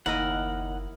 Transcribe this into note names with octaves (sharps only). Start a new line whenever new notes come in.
F#1 D#2 E4 A#4 D#5 F#5